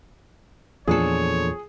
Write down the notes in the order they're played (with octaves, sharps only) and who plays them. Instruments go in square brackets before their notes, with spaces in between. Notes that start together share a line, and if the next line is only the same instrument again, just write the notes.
[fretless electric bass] E2 A#2 [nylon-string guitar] F3 D4 A4 [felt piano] G#4 [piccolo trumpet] C#5